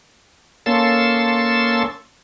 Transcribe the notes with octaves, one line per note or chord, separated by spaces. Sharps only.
A#3 C#4 A4 C6 E6 A6